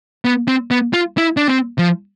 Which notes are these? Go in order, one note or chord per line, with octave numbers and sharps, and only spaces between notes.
B3
C4
B3
F4
E4
D4
C4
F3